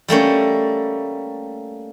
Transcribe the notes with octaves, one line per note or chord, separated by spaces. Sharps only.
G3 A3 A#3 C#4